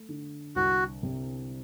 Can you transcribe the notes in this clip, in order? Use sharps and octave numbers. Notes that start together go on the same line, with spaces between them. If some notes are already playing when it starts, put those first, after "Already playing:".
Already playing: A3
D3
C2 F#4
C3